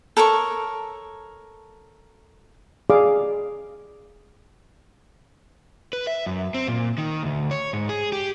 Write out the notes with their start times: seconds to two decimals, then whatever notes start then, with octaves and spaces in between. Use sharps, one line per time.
0.17 A4 A#4 C#5 C#6
2.90 G#4 D5 F5 D6
5.93 B4
6.07 E5
6.26 F#2
6.54 C4
6.68 A#2
6.98 D#3
7.23 D2
7.51 C#5
7.73 G#2
7.89 G#4
8.12 G4